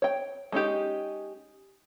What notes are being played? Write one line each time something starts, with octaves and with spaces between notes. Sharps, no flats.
C#5 G5
G#3 C#4 D#4 G4